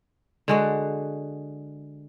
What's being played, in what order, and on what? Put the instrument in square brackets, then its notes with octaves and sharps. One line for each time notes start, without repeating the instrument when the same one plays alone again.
[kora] D3 G#3 F#4